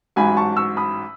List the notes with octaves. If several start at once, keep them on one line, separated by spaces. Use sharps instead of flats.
A1 G#2 F#3 G#5 B5
A5 C#6
C#6 E6
B5 D#6